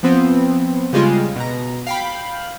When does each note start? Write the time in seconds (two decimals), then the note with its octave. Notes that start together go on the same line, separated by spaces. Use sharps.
0.03 F3 B3 C4
0.93 C#3 G3 G#3 F4
1.36 B2 A#5
1.87 F5 G5 B5